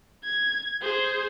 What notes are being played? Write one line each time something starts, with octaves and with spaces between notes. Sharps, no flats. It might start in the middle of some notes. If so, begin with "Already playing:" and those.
G#6
G#4 C5